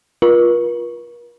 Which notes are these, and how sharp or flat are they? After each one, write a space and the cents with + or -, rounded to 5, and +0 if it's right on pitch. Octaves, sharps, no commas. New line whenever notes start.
F4 +5 A#4 +45 C#6 +0